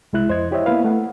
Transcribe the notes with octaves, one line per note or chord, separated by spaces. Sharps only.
C2 G#3 E4 F#6
F2 C5 D#5 G#6
E4 G4 C5 C#5 D#5 E5
A#3 B3 E4 B4 F5
A3 F#5